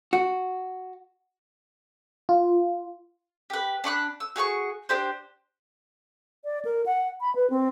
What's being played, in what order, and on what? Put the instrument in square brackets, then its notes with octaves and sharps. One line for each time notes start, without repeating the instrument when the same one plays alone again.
[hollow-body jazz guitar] F#4
[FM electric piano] F4
[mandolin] G4 B4
D4 B5 C#6 F#6
E6
F#4 G#4 A#5 C#6
D4 G4 C5
[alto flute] D5
A#4
F#5
B5
B4
C4